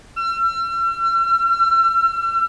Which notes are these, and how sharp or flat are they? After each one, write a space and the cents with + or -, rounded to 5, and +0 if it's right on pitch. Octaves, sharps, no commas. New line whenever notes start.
E6 +45